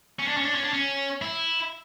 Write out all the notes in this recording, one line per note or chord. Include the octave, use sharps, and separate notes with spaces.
C#4
D4
C#4
D4
C#4
D4
C#4
E4